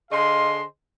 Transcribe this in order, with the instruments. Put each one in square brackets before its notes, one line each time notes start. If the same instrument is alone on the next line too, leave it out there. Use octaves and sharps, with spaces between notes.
[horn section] D3 G#4 C5 D#5 F5 C6